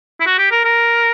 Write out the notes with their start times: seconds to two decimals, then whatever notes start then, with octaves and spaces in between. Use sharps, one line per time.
0.20 E4
0.26 F#4
0.38 G4
0.51 A#4
0.65 A#4